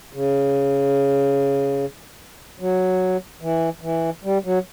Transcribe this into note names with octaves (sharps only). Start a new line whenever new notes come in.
C#3
F#3
E3
E3
G3
F#3